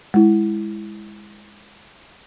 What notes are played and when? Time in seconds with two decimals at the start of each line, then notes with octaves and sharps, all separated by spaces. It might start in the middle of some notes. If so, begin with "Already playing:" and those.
0.14 G#3 E4